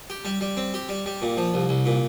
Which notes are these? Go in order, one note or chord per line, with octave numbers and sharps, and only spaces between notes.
G4
G3
G3
C4
G4
G3
G3
A#2
F3
C2
C2
A#2